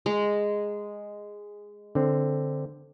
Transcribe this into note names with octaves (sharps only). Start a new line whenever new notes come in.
G#3 A#5
D3 C4